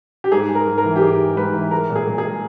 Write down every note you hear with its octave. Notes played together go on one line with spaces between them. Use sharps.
G4
G#2 G#4
G#3
A#4
G#2
A#4
E3
G4
G#2 G#4
G#3
G#2 B4
E3
G#3 A#4
A#2
G#4
A#2
G#4
G#3